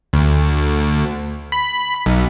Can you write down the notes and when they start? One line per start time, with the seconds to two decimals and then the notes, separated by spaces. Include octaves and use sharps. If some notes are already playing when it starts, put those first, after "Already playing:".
0.13 D2
1.52 B5
2.06 B1